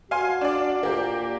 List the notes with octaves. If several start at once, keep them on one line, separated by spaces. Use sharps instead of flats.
F#4 F5 G#5 C6
D4 D5
A#2 A#3 G4